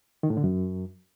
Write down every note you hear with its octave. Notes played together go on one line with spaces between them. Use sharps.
D#3
A2
D3
F#2